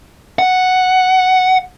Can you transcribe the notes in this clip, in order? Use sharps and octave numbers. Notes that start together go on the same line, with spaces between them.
F#5